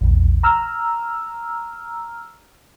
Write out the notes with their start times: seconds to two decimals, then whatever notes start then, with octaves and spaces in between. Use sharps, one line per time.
0.01 A#1 E2
0.43 A#5 E6 F6